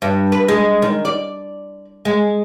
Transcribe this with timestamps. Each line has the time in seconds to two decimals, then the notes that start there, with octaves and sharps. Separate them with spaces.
0.02 G2
0.32 B4
0.48 G#3
0.82 D#3
1.05 D5
2.05 G#3